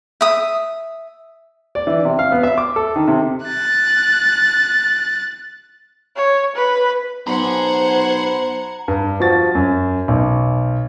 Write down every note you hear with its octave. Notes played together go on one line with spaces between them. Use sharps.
E5 D#6
D5
E3
C3
F5
B3
E5
D6
A4
D#3
C3
F#6 A6
C#5
B4
B1 C5 F#5 A#5 B5 G#6
G2
F3 F#4 A6
F#2
B1